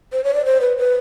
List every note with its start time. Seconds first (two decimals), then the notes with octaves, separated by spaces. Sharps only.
0.12 C5
0.24 C#5
0.34 D5
0.45 C5
0.61 B4
0.77 B4